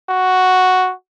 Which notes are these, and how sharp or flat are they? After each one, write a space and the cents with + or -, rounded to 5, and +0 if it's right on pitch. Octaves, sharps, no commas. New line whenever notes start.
F#4 +0